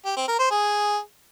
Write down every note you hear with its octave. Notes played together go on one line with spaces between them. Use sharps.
G4
C4
A#4
C5
G#4